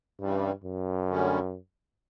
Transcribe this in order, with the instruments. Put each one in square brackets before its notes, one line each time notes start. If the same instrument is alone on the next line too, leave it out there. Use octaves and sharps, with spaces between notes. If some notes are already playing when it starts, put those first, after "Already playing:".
[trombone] G2 [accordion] C#3 E3 G3
[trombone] F#2
[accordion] D2 D3 G3 C#4